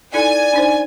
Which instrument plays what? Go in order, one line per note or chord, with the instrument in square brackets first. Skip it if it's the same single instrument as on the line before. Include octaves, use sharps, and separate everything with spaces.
[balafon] D#4 E4 A4 [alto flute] D5 [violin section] G#5
[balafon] D4 D#4 C5